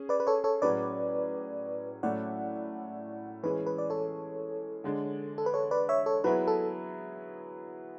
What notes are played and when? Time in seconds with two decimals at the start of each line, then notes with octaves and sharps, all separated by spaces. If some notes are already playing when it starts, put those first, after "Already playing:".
Already playing: C#4 G#4
0.09 B4 D5
0.20 B4
0.27 A4 C#5
0.44 A4 C#5
0.62 A2 F#3 C#4 G#4 B4 D5
2.03 A2 F#3 A3 C#4 E4 D5 F#5
3.43 E3 G#3 C#4 G#4 B4
3.66 B4
3.78 D5
3.90 A4 C#5
4.84 D3 G#3 D4
5.38 A4
5.46 B4
5.54 A4 C#5
5.71 B4 D5
5.89 C#5 E5
6.06 A4 C#5
6.24 F#3 B3 E4 G#4 B4
6.48 A4